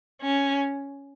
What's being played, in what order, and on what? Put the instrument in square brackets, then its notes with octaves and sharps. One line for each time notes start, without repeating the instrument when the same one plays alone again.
[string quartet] C#4